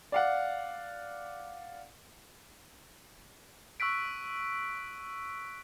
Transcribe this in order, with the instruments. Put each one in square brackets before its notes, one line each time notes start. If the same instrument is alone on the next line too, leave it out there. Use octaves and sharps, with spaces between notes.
[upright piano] D5 F5 F#5
[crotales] C#6 E6 F#6 B6 D7